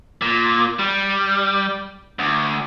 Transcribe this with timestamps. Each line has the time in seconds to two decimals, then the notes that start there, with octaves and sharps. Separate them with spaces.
0.22 A#2
0.79 G3
2.19 D2